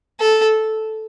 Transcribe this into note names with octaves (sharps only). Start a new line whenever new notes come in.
A4